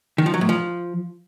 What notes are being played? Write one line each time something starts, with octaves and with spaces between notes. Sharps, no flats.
D#3
F3
F#3
A2
F3